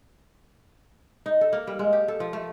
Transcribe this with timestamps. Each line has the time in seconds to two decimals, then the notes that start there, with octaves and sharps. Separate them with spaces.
1.26 D#4
1.41 A4
1.53 A#3
1.67 G3
1.79 G#3
1.93 G4
2.08 A4
2.20 F3
2.33 A3